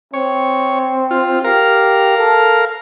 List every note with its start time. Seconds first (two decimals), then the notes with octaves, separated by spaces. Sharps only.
0.14 C4 C#5
1.11 F4
1.44 G4 A#4 F5
2.18 A4